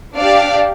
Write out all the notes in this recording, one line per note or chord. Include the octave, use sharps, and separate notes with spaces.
D4 G4 D5 F5